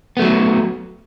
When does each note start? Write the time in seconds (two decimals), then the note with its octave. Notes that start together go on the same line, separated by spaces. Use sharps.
0.17 B3
0.19 A3
0.22 F#3